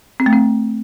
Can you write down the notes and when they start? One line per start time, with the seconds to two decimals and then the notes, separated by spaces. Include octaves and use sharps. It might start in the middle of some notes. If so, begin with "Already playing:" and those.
0.20 C4
0.26 A3
0.33 C4